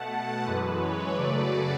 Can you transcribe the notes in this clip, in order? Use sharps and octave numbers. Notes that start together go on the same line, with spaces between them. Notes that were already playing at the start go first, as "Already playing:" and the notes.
Already playing: B2 A3 F#5 A5
F#2 E3 G#3 B4
C#5
F#2 C#3 F#3 A3 B4 D5